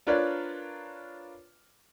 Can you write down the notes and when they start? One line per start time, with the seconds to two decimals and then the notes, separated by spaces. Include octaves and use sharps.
0.07 D4 F4 A#4 B4 C#5 D5